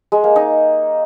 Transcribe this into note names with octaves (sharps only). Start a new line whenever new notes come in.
G#3
A#3
D#4